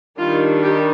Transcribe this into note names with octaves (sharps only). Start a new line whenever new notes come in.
D#3 G3 D4 F4
G4